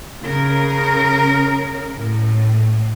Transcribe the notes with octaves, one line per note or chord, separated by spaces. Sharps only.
C#3 A#4
A2